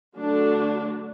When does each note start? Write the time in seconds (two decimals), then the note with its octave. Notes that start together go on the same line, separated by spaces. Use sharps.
0.17 D3 F#3 A3 D4